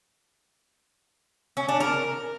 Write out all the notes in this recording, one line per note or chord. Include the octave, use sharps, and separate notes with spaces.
C#4
D4
A#4